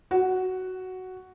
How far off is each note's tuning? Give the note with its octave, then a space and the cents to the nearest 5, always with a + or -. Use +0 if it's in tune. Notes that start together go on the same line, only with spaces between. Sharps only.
F#4 +5